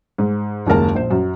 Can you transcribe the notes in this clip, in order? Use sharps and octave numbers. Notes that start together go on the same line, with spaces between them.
G#2
F#1 D#2 G#3 A#4 A5
A#1 C5
F#2